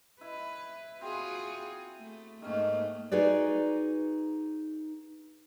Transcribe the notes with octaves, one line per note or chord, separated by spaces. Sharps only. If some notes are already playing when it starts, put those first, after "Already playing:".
E4 B4 E5
C4 F4 F#4 G#4
A3
G#2 D#3 A3 A#3 C#4
D#4 F#4 G#4 B4 D5